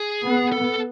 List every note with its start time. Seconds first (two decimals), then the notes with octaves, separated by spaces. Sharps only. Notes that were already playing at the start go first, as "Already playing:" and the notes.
Already playing: G#4
0.23 B3
0.52 A4